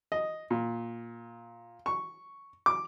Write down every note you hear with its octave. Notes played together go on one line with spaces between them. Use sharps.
D#5
A#2
C#6
D6